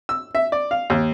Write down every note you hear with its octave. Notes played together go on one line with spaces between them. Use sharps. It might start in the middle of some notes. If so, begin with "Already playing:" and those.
E6
E5
D5
F5
D#2